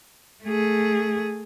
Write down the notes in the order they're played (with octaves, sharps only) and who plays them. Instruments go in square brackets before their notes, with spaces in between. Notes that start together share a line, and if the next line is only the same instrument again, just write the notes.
[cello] A3 G#4